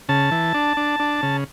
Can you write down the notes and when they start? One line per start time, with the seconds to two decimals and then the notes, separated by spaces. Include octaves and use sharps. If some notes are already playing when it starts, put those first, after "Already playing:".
0.09 C#3 A5
0.31 E3
0.54 D4
0.77 D4
1.00 D4
1.23 C#3